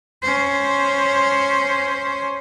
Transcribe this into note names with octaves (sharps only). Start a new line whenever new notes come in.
C#4 C5